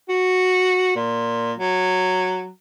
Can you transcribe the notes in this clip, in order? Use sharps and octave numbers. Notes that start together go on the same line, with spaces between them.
F#4
A#2
F#3